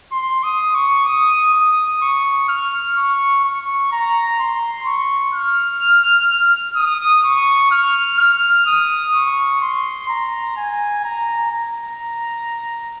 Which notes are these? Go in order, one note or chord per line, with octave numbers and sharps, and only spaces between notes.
C6
D#6
C#6
D#6
D#6
C#6
F6
C#6
C#6
A#5
C6
C#6
F6
D#6
C#6
F6
F6
D#6
C#6
C6
A#5
G#5
A#5
A#5